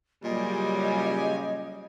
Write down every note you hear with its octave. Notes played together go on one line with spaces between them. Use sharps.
A#2 C#3 F#3 G3 G4 D#5 G#5